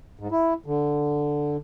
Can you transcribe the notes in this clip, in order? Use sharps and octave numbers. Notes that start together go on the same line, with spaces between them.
G#2
E4
D3